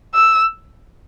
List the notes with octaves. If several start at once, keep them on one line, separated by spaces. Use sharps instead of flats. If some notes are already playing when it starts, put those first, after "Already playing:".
E6